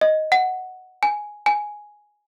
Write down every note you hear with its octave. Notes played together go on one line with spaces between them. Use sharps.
D#5
F#5
G#5
G#5